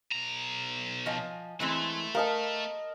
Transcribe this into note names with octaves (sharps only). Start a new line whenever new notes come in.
B1 A#5
F3 D#5 G#5
E3 G#3 A3 C4
A#4 D#5 F5 A5